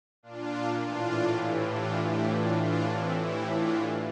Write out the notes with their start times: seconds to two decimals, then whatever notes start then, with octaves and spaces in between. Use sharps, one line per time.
0.23 A#2 D4 F4
0.83 A2 E3 D4 F4
1.42 A2 E3 E4 G4
1.72 D4 F4
2.02 A2 E3 E4 G4
2.32 D4 F4
2.62 A2 E3 D4 F4
2.92 C4 E4
3.22 A2 E3 E4 G4
3.52 D4 F4